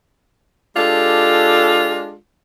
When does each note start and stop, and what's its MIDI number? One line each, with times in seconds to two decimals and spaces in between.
0.76 2.15 56
0.76 2.15 62
0.76 2.15 65
0.76 2.15 67
0.76 2.15 69